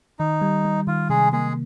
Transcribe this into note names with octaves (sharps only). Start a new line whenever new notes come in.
D#3 D#4
G3
G3
D#3 F4
C3 G#3 G#4
G#3 A#3 G#4